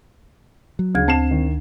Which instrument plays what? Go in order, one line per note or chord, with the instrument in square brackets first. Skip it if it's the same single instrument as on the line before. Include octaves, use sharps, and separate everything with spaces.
[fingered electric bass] F#3
[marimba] D2 G#6 [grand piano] C#3
[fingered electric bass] C4 [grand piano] A5 C7 E7
[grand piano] D#3